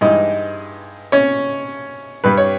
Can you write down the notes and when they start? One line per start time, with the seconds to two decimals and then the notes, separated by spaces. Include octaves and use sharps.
0.01 G2 E3 G#3 D#4 D#5
1.12 C#4 C#5
2.24 G2 G3 B4
2.37 C#5